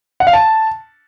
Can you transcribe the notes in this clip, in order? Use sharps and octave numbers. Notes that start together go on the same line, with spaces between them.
F#5
F5
A5